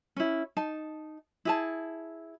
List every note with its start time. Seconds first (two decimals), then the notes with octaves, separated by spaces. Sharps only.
0.16 C#4 E4
0.57 D#4 A5
1.45 E4 G#4 A5